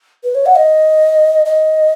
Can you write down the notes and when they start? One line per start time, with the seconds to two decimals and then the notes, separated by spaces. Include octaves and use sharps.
0.24 B4
0.35 C#5
0.46 F#5
0.57 D#5
1.46 D#5